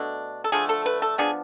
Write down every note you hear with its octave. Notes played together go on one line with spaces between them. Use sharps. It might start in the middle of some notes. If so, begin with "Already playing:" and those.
Already playing: B2 A3 D4
A4
D3 F3 A3 G#4
A4
B4
A4
F3 B3 D4 G#4